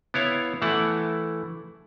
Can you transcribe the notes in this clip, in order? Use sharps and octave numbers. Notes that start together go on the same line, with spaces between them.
B3 E4 C#5 F5
E3 A3 E4 F#5 A5